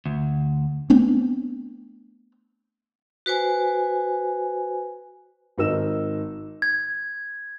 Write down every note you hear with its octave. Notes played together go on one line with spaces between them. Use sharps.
D2
A3 B3 C4 D4
F#4 B4 C5 G#5
G#1 D#4 A#4 E6 E7
G#6